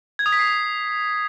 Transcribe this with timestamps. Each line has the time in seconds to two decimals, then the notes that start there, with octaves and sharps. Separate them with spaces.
0.19 G#6
0.26 D#6
0.32 B6
0.39 C7